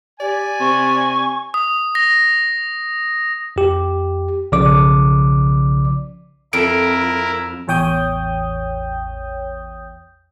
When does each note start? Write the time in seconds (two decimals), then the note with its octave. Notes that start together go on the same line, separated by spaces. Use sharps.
0.20 G4 D5 G#5
0.60 C3 C#6
1.54 D#6
1.95 A#6
3.56 F2 G4
4.52 B1 C#3 F3 D5 D6
6.53 F2 E4 A#4 D7
7.67 A1 E2 C#5 G5 D#6 G6